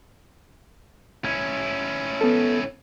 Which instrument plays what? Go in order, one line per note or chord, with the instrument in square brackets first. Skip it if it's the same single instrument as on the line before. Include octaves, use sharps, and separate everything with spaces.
[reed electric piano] C2 G#6 [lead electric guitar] C#4 E4
[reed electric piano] B3 A4